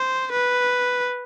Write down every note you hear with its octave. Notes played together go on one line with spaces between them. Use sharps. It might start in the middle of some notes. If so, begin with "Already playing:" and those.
Already playing: C5
B4